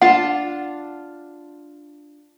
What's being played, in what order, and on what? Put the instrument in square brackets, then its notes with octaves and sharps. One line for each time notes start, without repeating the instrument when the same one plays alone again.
[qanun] D4 F4 A5 [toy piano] F#5